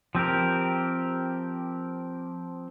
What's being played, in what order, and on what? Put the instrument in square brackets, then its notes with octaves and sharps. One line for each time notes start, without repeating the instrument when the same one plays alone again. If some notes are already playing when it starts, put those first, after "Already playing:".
[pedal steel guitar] F3 C4 G4 A#4